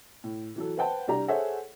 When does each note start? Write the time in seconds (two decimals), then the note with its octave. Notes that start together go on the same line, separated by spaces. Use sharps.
0.24 A2
0.56 E3 F#3 A4
0.77 B4 C5 F#5 G5 A5
1.08 C2 D4 G4 A#5
1.28 G#4 A4 C5 C#5 E5 F#5